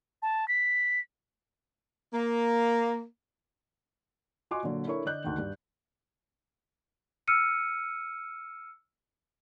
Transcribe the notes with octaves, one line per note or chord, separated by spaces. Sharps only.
A5
B6
A#3
F4 F#4 D#5 G#5 C6 D6
A#2 D3 F#3
D4 E4 A4 A#4 C#5 C#6
D3 D5 D#5 F#6 G6
D2 D#3
G2
E6 F6 C#7 D#7